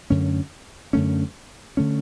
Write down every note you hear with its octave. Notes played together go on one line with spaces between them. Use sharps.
F#2 D3 A3 C#4
F#2 D3 A3 C#4
D3 A3 C#4